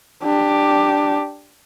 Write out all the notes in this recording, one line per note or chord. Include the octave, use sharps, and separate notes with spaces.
D4 G4